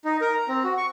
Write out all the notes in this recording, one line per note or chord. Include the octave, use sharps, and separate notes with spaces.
D#4
A#4
A#5
C4
F#4
C#6